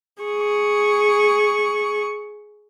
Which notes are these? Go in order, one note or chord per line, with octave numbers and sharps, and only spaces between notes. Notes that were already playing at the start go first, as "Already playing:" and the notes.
G#4 C#6